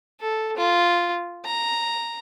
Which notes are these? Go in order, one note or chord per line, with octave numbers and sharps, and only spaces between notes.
A4
F4
A#5